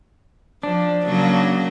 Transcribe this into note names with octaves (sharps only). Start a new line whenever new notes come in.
F3 D4
C#3 F#3 A#3